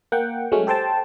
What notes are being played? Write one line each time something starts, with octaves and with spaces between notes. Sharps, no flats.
A#3 F#5 G5
F#3 G#3 A3 C#4
G4 A4 C5 G5 A5